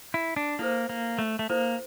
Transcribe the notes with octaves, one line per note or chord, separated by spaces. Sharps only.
E4
D4
A#3 E4 A4 C5
A#3
A3
A3
A#3 E4 A4 C5